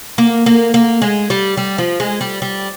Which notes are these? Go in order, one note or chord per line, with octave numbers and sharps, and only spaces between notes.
A#3
A#3
A#3
G#3
G3
G3
F3
G#3
G3
G3